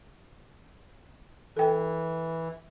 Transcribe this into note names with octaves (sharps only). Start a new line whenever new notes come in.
E3 A4 G5